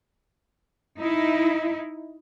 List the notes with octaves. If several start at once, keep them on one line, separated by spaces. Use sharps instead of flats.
D#4 E4